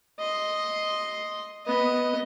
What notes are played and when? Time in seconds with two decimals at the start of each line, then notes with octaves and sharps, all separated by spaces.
0.19 D#5 C6
1.66 B3 D#5